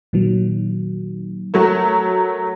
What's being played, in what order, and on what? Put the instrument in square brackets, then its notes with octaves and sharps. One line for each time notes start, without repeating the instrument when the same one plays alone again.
[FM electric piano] A#2 D#3 F#3
[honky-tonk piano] F#3 A3 [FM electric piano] A#4 A#5